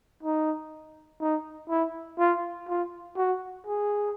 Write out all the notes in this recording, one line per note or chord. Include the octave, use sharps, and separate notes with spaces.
D#4
D#4
E4
F4
F4
F#4
G#4